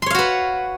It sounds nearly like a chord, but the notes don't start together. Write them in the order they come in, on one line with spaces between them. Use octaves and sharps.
C6 C#5 F5 F#4 B4